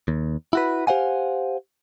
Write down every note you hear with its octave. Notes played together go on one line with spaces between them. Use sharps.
D#2
E4 F#4 B4
G4 C5 F5 F#5 G#5